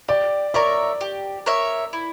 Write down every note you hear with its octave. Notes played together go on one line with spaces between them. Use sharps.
G4 D5
A#4 C#5 D5 E5
G4
A#4 C#5 E5
E4